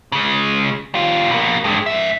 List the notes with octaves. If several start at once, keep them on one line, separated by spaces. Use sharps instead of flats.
C#3 G#3
G3 F4
B2 A#3
G2 G#3
G#2 E5